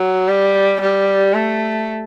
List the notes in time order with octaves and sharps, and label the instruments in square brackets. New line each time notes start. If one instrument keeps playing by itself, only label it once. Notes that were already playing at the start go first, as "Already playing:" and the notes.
Already playing: [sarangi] F#3
G3
G3
A3